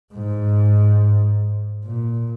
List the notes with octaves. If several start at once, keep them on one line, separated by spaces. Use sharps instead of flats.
G#2
A#2